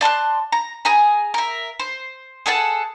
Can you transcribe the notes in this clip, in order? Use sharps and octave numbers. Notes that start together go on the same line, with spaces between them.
D5 A5 C6 F#6
A#5
G#4 G#5 A#5
A#4 E5
C5
G#4 A4 F#5 A5